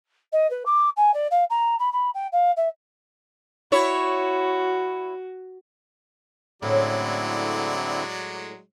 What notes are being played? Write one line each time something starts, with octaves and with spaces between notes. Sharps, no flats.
D#5
B4
D6
G#5
D5
F5
A#5
B5
B5
G5
F5
E5
E4 F#4 C#5
A2 D3 F#3 G#3 C4 C#4 E4 D5